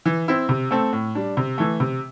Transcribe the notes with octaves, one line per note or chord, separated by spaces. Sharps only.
E3
C4 E4
C3
A3 C4 A4
A2
G3 D4
C3
E3 A3
C3